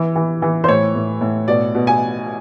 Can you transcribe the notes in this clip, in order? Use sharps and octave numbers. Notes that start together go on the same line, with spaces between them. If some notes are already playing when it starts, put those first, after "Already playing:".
Already playing: E3
E3
E3
C5
A2 C#5
A2
A2
B2 D5
B2
G#5